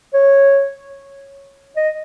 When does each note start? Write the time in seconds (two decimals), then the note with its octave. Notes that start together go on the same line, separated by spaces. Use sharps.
0.14 C#5
1.77 D#5